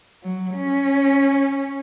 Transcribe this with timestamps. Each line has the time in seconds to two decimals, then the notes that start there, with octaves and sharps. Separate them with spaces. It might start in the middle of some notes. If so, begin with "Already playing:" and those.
0.23 F#3
0.56 C#4